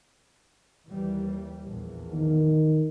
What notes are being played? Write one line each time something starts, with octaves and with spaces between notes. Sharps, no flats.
D#2 E3 G3
A#1 E2
D#3